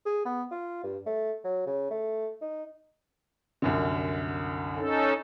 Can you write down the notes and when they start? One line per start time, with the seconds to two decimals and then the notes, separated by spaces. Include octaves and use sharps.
0.06 G#4
0.26 B3
0.51 F4
0.83 G2
1.06 A3
1.44 F#3
1.66 C#3
1.90 A3
2.42 D#4
3.62 C2 F#2 D3
4.76 C#4 D#4 A4